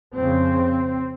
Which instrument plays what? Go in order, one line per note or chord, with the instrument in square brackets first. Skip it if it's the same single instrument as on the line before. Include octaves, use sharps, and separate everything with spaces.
[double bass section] F2 C#3 C4